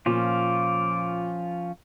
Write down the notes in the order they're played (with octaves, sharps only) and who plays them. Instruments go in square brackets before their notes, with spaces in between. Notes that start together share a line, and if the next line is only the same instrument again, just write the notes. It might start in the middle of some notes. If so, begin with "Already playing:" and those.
[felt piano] A#2 [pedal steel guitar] F3 C#4 F4 [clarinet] D6